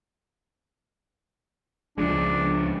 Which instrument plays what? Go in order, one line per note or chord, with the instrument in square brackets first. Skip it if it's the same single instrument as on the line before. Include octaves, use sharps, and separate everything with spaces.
[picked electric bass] C#2 F3 G#3 [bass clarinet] D4